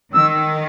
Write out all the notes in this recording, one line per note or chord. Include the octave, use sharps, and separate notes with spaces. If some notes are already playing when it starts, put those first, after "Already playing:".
D#3 E6